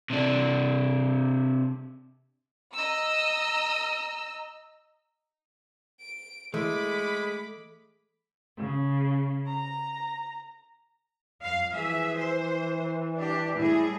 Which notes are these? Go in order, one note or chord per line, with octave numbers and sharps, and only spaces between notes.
C3 D4
D#5 A#5 E6
D7
E3 G#3 A3 B5 D6
C#3
A#5
F2 F5
E3 F3 G#4 E5
C5
D4 G4
A2 G3 E4 G#4